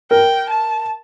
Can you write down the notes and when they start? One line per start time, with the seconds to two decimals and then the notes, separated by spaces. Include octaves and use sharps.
0.11 A#4 G5
0.49 A5